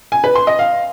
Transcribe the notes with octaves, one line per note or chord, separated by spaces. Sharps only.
G#5
B4
C6
D#5
F5